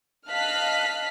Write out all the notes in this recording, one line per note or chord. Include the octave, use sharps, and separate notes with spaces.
D#5 F5 A5 F6 F#6 B6